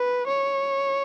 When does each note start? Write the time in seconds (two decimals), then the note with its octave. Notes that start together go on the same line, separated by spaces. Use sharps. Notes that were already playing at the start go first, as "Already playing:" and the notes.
Already playing: B4
0.27 C#5